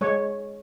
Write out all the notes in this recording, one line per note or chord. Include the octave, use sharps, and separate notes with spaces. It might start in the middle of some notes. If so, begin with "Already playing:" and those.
G#3 C#5